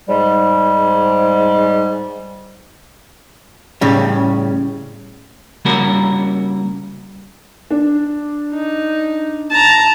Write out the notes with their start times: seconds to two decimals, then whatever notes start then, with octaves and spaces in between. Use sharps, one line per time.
0.08 G#2 G3
3.81 A2 C#3 G3
5.65 C#3 G3 A#3 C#4 F#4 A#4
7.70 D4
8.52 D#4
9.51 A5 A#5